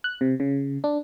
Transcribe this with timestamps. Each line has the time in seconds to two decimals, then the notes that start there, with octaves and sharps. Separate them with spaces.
0.04 F#6
0.21 C3
0.40 C#3
0.84 D4